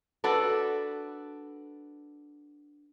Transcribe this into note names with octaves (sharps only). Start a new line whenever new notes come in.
D4 F#4 A4 B4